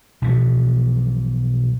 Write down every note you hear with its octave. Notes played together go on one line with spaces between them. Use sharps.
B1 B2 E3 F3